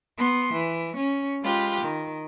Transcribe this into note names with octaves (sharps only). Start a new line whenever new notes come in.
B3 C6
E3
C#4
G#3 F4 G4 B4
D#3